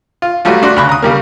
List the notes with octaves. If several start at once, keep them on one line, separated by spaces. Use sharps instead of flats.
F4
F#3 G3 A3 F4
A3 D4 F#4 C6 F#6
D2 C#3 B5 C#6 F#6
A#5 D#6
C#3 G3 A#3